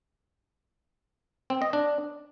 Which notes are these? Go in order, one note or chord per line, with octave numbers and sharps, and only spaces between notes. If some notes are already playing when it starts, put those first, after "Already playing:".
C4
D#5
D4